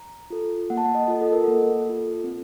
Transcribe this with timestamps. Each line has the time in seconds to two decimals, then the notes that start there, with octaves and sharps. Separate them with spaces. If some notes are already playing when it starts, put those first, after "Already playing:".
Already playing: A#5
0.30 F4 A4
0.70 A#3 F#5
0.77 A5
0.85 F#5
0.95 D#5
1.08 F4 A4
1.22 A4
1.32 A#4
1.44 A#3 A4
1.86 F4 A4
2.24 C4